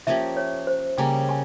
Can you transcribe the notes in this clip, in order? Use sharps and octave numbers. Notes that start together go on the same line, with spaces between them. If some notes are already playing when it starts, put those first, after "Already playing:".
F3 A#3 C#4 G4 E5
C#5
C5
C#3 G3 A#3 G#5
G#5